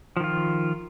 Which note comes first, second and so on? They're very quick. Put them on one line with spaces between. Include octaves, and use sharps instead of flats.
F3 D#3 F4